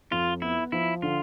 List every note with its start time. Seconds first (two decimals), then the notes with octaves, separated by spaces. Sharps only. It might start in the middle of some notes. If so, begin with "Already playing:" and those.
0.11 F2 F4
0.42 B3 E4
0.72 F3 E4
1.02 D3 F4